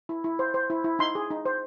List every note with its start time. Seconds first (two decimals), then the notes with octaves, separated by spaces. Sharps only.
0.09 E4
0.24 E4
0.39 C5
0.54 C5
0.70 E4
0.84 E4
0.99 D#4 C6
1.15 G#4
1.30 D#4
1.45 C5